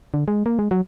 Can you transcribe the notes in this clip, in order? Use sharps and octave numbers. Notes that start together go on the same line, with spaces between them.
D3
G#3
A#3
G#3
F#3